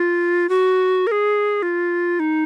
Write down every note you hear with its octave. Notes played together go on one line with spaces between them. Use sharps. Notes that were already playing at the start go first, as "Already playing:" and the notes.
Already playing: F4
F#4
A#4
G#4
F4
D#4